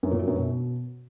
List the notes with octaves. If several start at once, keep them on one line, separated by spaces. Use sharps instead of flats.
F#2
A#2
F#3
F#2
B2